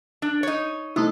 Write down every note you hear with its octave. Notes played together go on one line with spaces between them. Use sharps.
D4
D#4 C#5
C3 A3 D#4 E4